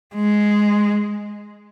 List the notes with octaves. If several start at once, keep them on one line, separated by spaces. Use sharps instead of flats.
G#3